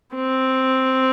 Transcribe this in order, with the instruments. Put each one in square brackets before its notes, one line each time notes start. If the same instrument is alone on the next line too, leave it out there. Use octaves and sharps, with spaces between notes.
[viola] C4